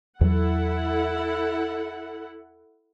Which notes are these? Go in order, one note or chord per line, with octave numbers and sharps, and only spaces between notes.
E2 F#3 E4 A4 F#5